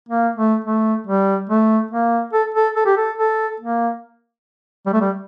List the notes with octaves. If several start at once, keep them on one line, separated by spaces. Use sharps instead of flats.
A#3
A3
A3
G3
A3
A#3
A4
A4
A4
G4
A4
A4
A#3
G3
A3
G3